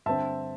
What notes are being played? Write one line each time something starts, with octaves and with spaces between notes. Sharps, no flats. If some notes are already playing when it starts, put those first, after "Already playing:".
G2 D3 C4 E5 A5